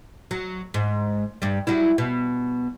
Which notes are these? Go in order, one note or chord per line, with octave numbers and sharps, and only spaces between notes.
F#3
G#2
G2 G3
F#3 G3 E4
B2